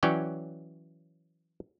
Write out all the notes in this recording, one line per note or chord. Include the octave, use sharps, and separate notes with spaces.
E3 F#3 C#4 C#5 D5 G5